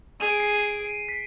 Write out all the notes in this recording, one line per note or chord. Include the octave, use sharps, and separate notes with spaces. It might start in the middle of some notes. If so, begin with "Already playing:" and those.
G#4 D#7
D7
C7
B6